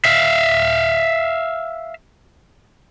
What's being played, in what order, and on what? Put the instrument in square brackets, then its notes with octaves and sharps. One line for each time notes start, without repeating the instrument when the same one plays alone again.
[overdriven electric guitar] E5 F5